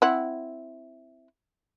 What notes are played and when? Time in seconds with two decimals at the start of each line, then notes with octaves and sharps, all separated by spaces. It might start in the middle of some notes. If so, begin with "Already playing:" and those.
0.02 C4 E4 F#5